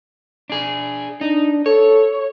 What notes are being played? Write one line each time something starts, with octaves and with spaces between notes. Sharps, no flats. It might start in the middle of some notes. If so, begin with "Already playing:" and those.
D4 G#4
D4 D#4
A4 C#5